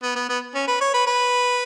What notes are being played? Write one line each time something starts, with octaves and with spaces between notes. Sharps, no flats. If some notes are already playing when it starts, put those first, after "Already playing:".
B3
B3
B3
C#4
B4
C#5
B4
B4